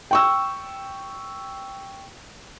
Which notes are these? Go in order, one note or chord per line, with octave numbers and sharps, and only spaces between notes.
G5 C#6 E6